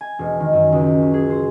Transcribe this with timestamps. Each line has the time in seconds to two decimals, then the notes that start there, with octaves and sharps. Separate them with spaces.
0.01 G#5
0.19 E1
0.40 D#3
0.53 F#2
0.72 C#2
1.02 C#4
1.14 G#4
1.30 C5